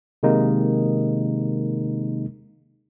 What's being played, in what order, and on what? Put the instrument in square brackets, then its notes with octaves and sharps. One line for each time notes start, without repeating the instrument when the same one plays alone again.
[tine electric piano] C3 D#3 G#3 A#3 D#4